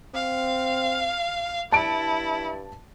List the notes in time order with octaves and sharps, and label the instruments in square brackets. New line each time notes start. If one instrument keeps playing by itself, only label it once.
[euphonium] C4 [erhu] F5
[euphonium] G2 [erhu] E4 [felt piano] A5 D7